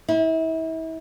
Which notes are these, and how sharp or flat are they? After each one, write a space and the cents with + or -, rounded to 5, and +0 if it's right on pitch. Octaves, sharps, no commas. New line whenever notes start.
E4 -35